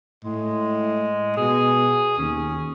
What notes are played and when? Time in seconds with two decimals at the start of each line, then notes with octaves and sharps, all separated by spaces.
0.25 A2 G#3
1.37 B2 G#4
2.18 D#2 C#4